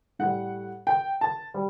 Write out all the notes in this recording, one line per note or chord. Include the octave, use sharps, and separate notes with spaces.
A2 G3 F#5
G5
A5
G3